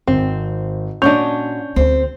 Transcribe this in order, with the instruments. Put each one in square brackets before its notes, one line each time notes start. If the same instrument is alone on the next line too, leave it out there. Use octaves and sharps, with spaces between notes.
[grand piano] G#1 [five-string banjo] C4
[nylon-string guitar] A#2 F#4 D#5 [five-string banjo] C#4 D4 [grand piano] C#6 G6 F7
[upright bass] D2 [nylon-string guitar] C4